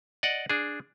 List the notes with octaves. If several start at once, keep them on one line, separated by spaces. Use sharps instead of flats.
D5 D#5 F#5
D4 G#4